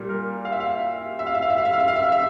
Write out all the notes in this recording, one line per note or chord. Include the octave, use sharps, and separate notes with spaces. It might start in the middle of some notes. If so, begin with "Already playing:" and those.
Already playing: A#2 G3 A#3
A#4
F5
E5
F5
E5
F5
E5
F5
E5
F5
E5
F5
E5
F5
E5
F5
E5